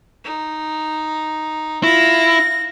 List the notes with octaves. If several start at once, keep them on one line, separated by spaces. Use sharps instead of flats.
D#4
E4 F4 A#6